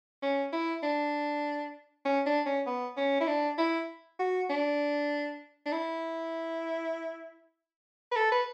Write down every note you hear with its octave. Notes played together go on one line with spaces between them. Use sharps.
C#4
E4
D4
C#4
D4
C#4
B3
C#4
E4
D4
E4
F#4
D4
D4
E4
B4
A4
B4